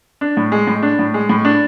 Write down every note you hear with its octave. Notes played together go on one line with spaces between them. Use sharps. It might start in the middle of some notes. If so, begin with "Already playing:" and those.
D4
A2
G#3
A2
D4
A2
G#3
A2
D4